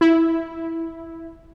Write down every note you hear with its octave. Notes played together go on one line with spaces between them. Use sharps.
E4